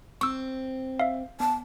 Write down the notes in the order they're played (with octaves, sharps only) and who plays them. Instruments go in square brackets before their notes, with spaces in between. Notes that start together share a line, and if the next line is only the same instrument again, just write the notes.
[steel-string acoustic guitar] C4 [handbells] C#6 E6
[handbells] E5 F5
[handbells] B3 [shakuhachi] A5